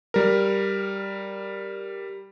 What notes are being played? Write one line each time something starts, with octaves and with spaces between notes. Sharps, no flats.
G3 A#4